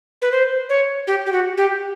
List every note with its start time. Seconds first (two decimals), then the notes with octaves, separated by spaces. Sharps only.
0.22 B4
0.32 C5
0.69 C#5
1.07 G4
1.26 G4
1.32 F#4
1.57 G4